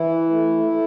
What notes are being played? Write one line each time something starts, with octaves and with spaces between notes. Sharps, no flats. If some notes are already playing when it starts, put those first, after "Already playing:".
Already playing: E3 E4
A3
A3